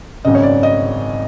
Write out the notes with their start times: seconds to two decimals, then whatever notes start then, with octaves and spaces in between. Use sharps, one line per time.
0.25 G#1 F#2 C#3 D#5
0.35 C#5
0.43 D5
0.63 D#5